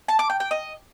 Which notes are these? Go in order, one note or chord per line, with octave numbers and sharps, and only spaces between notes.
A5
D6
G5
G5
D#5